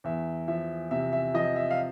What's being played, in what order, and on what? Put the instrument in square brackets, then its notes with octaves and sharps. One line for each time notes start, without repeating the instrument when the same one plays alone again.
[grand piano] E2 E5
F3 E5
C3 E5
E5
F3 D#5
E5
F5